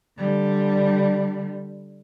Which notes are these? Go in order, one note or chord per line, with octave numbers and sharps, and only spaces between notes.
D3 G3